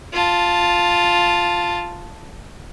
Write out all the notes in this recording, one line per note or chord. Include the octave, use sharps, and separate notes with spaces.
F4 A5